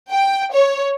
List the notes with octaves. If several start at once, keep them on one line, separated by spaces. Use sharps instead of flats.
G5
C#5